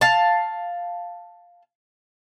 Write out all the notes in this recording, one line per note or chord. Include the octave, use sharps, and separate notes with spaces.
F5 A5